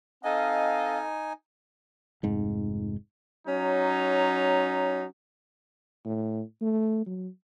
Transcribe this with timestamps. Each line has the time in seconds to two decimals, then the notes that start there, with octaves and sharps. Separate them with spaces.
0.24 C4 D#4 A4 D#5 F5 G#5
2.23 F1 G#2
3.47 F#3 C#4 D#4
6.05 A2
6.61 A3
7.07 F#3